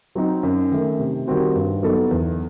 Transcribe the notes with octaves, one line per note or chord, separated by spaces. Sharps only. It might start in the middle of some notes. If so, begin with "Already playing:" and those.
F#3 C4 D#4
F#2
D#3 A3
C3
D#3 G3 C4 F#4
G2
F#3 B3 D#4 A4
E2